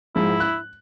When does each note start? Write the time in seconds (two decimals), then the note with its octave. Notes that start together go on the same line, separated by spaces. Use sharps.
0.16 G#2 F3 G#3 E4
0.40 F#6